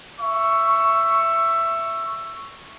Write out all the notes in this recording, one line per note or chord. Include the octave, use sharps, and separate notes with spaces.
E5 C#6